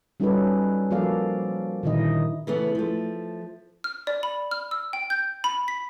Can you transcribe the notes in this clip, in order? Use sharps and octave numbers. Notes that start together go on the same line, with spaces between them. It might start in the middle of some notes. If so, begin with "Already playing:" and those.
G3 C#4 D#4 F#4 A4 B4
F3 A#3 F#4 A4 D5 F5
A#2 D3 D#3 D#4 E4 D#5
C#3 E3 A3 B3
F3 A3
F6
D5
B5
F6
E6
G5
G6
B5
B6